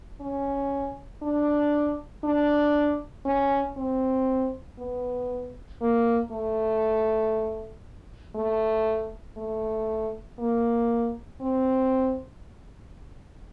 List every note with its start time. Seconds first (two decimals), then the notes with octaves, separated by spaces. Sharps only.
0.21 C#4
1.22 D4
2.24 D4
3.26 C#4
3.77 C4
4.78 B3
5.81 A#3
6.32 A3
8.35 A3
9.37 A3
10.39 A#3
11.41 C4